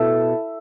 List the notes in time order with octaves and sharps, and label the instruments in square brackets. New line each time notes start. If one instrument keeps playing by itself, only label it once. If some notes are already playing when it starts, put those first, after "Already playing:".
Already playing: [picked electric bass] B2 [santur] E4 A4